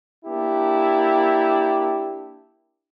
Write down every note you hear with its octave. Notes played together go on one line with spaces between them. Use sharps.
A#3 D4 E4 G4